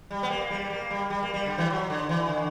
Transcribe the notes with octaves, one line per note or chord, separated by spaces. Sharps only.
G3
B3
A#3
G3
A#3
G3
G3
A#3
G3
D3
E3
F#3
D3
E3
D3